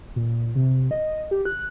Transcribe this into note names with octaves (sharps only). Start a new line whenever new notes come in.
A#2
C3
D#5
G4
F#6